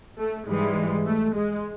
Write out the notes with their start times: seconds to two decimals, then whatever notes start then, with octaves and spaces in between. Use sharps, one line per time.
0.18 A3
0.47 G#2 E3 G3 G#3
1.06 A3
1.36 G#3